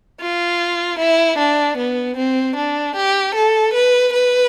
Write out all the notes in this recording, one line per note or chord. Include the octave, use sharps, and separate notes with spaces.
F4
E4
D4
B3
C4
D4
G4
A4
B4
B4